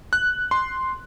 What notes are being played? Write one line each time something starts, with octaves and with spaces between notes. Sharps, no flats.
F#6
C6